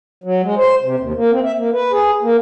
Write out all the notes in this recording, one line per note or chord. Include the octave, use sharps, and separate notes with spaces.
F#3
G#3
C5
C3
D#2
A#3
C4
E5
A#3
B4
G#4
A#3